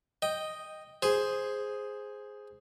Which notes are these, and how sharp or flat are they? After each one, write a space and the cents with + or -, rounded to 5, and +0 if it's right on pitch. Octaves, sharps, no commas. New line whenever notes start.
D#5 +0 G5 +0
G#4 +0 C5 +0